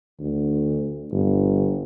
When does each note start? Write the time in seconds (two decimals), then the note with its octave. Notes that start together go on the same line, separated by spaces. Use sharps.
0.19 D2
1.12 G1